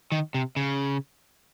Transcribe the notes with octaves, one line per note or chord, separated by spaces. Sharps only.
D#3
C3
C#3